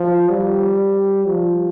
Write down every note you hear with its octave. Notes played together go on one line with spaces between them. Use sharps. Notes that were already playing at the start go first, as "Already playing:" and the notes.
Already playing: F3
G3
F3